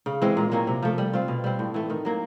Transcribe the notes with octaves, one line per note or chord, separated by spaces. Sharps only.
C#3
E3 G#3 C4
A#2
F#3 A#3 C#4
C3
F3 A3
G3
C4 F4
B2
G3 C4
A2
E3 A3
D#3
F#3 A#3